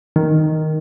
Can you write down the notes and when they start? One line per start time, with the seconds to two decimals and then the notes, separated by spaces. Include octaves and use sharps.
0.16 D#3